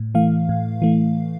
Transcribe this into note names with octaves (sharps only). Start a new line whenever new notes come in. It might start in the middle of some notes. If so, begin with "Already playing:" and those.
Already playing: A2
E3 A3 F5
A2
E3 A3